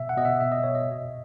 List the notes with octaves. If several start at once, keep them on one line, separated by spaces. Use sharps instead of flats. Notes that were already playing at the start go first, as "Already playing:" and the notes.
Already playing: B2 E5
F#5
B2 D#5
E5
B2 E5
D#5
B2 C#5
D#5
A#2